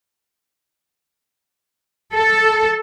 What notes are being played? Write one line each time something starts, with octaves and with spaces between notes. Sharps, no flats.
A4